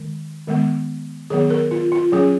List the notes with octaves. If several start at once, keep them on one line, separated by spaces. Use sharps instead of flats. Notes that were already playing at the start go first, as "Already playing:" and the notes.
Already playing: D#3 G#3
D#3 G#3 B3
D#3 F#3 B3 G#4
A#4
F4
F4
F#3 C#4 G#4